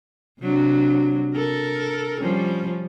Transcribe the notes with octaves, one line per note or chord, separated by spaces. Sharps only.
C3 F#3 D4
A4 A#4
F3 G3 C#4